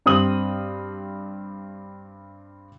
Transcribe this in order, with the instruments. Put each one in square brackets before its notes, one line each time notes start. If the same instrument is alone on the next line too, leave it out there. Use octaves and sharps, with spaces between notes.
[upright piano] G2 C4 D#6 F#7